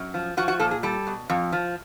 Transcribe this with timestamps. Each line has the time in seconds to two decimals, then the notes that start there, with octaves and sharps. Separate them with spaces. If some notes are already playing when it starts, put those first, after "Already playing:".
Already playing: F#2
0.14 F3
0.37 F3 F#4
0.48 F#4
0.59 A#2 A4
0.71 G#4
0.83 G3 A4
1.07 B2
1.30 F2
1.53 F3